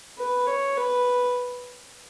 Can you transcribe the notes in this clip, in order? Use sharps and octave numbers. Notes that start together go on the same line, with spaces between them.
B4
C#5
B4